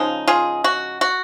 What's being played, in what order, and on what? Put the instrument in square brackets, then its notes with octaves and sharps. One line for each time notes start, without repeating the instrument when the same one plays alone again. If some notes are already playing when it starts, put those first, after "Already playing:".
Already playing: [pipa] C#3 F3 G#3 D#4
F4 G#4
F#4
F#4